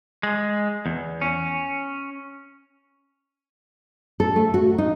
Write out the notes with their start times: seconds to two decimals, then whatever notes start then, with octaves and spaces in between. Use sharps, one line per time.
0.23 G#3
0.86 E2
1.21 C#4
4.20 A4
4.36 A3
4.54 F#4
4.78 D#4